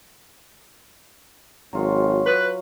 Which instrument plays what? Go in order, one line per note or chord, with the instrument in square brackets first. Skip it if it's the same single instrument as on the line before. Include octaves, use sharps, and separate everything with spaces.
[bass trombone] G#1 [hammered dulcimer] F#3 F4
[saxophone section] B4